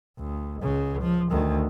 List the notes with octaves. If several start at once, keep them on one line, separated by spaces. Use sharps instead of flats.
D2
C#2 C#3
F3
D2 D#3